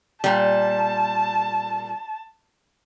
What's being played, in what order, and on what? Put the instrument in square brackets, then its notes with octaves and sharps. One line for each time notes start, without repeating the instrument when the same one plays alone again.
[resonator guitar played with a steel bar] A#2 G3 [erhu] A5